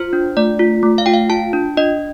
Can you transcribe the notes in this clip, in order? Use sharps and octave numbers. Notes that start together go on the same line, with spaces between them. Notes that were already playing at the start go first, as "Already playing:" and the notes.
Already playing: F4 C5
D4
A3 D5
F4
A3
F5
F4 G5
F5
F4 A5
D4
D4 D#5